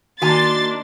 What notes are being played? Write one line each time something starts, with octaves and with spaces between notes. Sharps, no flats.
D#3 A#3 D4 F#4 G#5 A#5 C6 A6